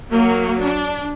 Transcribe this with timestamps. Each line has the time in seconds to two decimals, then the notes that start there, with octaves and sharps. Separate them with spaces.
0.12 F#3 A#3 F#4
0.63 D4